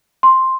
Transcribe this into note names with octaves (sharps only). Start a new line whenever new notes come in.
C6